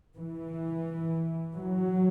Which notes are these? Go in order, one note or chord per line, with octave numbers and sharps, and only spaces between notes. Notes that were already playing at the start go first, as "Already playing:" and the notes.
E3
F#3